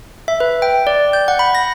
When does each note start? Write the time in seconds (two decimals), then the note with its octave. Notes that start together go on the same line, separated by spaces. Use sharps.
0.28 E5
0.40 B4
0.62 G5
0.87 D5
1.13 G6
1.28 F#5
1.39 B5
1.55 A#6